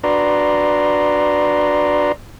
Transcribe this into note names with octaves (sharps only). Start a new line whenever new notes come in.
D4 F#4 B4 D5 A#5 C6